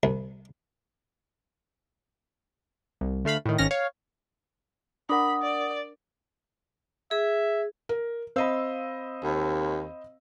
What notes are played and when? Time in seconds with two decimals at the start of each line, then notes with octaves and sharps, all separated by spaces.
0.03 C2
3.01 C2
3.25 D2 A3 F5 B5
3.46 A2 D#3
3.58 G#1 D#3 C#4 F6 A#6
3.71 C#5 F5
5.09 D4 A#4 F#5 B5 D#6
5.42 D5
7.11 G#4 E5
7.89 A#4
8.36 C4 C5 D#5 F5 B5 E6
9.24 D#2